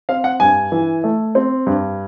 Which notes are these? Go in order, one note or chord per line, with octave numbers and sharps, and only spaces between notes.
C4 F5
F#5
G2 G#5
E3
A3
C4
G2